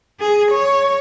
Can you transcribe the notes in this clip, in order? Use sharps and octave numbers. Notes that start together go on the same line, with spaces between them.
G#4
C#5